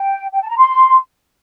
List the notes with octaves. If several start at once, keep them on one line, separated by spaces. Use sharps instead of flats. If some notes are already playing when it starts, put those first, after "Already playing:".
Already playing: G5
G5
A5
A#5
C6